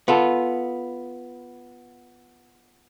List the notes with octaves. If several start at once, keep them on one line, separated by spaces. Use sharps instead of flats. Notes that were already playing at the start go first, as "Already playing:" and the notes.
B3 F4 A4